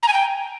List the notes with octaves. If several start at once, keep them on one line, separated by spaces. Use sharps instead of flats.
A#5
G#5
G5